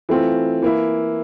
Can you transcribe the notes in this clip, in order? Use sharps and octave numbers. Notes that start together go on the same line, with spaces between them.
E3 A3 C4 F4
E3 A#3 E4